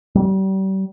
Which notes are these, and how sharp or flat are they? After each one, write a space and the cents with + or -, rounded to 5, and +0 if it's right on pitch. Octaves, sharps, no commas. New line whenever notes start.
G3 -35